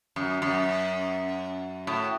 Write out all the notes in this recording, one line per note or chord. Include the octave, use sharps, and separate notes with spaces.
F#2
F#2
A2